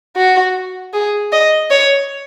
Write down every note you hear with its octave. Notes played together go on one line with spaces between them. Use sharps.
F#4
G#4
D#5
C#5